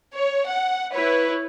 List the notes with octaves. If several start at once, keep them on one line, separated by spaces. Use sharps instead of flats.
C#5
F#5
E4 B4 C#5